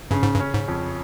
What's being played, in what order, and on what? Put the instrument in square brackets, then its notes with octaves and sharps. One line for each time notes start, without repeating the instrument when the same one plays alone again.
[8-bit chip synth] G2 [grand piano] C#3
[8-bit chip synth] G#2
G2
[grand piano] C#4
[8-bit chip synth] G#2
[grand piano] F2